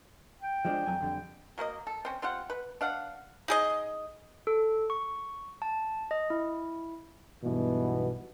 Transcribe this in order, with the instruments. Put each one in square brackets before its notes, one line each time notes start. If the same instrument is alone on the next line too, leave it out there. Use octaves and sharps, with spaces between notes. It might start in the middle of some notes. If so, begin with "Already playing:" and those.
[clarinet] G5
[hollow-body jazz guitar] F3 G#3 D4
F2 F#3 G#5
F2 D3 G3
[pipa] F#3 A#3 C5 D#5
A4
C4 C#4
C4 F4 G4 F#5
B4
D4 F5 F#5
D#4 G#4 D#5
[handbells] A4
C#6
A5
D#5
E4
[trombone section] B1 G2 B2 E3 B3